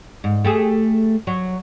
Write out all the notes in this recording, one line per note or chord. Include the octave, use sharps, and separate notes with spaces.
G#2
A3 G4 G#4
F#3